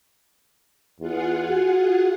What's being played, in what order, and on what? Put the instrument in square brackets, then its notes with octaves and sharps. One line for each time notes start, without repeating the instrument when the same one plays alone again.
[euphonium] E2 [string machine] F4 G#4 F#5
[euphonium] F#4